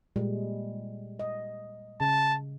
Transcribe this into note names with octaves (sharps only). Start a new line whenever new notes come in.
A#2 G3 G#3
D#5
C#3 A5